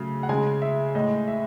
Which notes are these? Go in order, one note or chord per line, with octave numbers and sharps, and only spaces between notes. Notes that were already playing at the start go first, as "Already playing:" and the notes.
Already playing: C#3 F#3 A3
F#5
C#3 G#3 G#5
E5
A2 G#3 D#5
E5